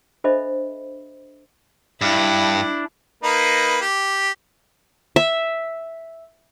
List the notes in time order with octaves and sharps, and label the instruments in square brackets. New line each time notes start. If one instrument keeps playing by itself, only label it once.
[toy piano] D4 A4 C5 D#5 E5 B5
[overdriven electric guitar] G2 [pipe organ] D4 [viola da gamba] E4
[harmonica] A#3 D#4 B4
G4
[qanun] E5